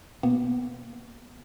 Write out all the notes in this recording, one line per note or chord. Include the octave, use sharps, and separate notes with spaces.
B2 A#3 B3